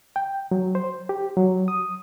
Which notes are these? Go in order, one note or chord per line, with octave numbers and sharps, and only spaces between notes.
G5
F#3
C5
G4
F#3
D#6